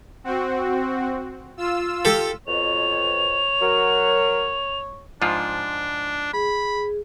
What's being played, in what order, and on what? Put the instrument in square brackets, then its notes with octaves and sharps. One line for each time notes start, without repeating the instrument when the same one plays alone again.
[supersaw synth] C4 F#4
F4 E6
[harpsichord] G4 A4
[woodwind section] F2 B2 [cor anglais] C#5 [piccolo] F7
[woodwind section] F#3 [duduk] A#4
[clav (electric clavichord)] G#2 F3 F4 [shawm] D4
[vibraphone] G#4 [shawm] B5